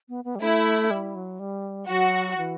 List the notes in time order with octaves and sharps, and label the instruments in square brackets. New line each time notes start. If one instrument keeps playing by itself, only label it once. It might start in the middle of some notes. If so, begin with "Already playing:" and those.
[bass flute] B3
B3
G3
[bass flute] A3 [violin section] E4
[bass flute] G3
F#3
G3
[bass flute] F#3 [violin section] F#4
[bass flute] E3